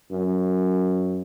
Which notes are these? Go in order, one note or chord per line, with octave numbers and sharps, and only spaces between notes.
F#2